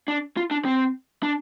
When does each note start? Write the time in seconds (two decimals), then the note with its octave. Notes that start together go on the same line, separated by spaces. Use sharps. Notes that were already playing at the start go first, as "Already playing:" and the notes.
0.08 D4
0.37 F4
0.51 D4
0.65 C4
1.23 D4